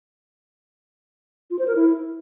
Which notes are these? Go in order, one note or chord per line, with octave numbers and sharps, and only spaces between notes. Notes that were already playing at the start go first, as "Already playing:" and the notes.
F4
C5
A#4
E4